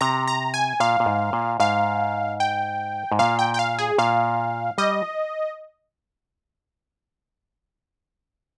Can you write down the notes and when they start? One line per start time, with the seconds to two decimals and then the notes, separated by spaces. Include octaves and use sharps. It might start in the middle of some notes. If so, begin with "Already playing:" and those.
0.01 C3 A#5
0.27 A#5
0.54 G#5
0.80 A#2 F5
1.00 A#2
1.06 G#2
1.33 A#2
1.60 G#2 F5
2.40 G5
3.12 G#2
3.19 A#2 F5
3.39 G5
3.54 G5
3.59 F5
3.79 G#4
3.98 A#2 F5
4.78 G3 D#5